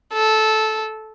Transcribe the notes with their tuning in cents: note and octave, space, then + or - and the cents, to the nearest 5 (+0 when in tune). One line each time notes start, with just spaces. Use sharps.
A4 -15